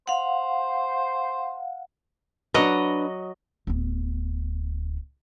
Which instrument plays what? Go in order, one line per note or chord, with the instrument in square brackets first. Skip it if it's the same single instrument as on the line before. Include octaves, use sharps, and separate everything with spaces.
[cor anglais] C5 [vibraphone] F5 F#5
[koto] F#3 D#5 F#5 [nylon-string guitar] D4 B4
[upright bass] D1 B3